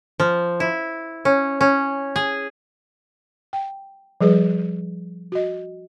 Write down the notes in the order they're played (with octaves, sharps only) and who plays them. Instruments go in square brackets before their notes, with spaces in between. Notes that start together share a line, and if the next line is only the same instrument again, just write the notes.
[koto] F3
E4
C#4
C#4
G#4
[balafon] G5
F3 G3 G#4 B4
F#4 D#5